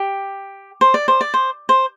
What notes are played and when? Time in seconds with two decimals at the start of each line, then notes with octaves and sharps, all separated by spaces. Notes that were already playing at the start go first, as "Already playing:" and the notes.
Already playing: G4
0.81 C5
0.94 D5
1.08 C5
1.21 D5
1.34 C5
1.69 C5